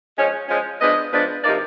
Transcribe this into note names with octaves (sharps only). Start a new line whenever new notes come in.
F3 G#3 C#4
F3 G#3 C#4
F3 G#3 B3 D4 D#5
F3 G#3 B3 D4
C3 F3 A#3 D#4 D5